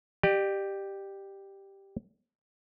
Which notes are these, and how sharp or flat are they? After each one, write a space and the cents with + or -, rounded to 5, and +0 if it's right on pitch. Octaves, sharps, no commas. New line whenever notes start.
G4 +0 D5 +40